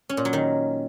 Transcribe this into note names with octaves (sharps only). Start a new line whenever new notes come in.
C#4
A#2
F#3
D#3